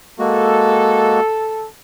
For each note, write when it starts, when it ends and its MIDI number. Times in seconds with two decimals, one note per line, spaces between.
0.19 1.20 56
0.19 1.20 58
0.19 1.20 66
0.19 1.67 69